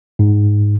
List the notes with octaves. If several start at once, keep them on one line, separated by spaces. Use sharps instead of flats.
G#2